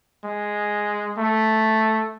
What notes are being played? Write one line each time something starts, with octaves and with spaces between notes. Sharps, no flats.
G#3
A3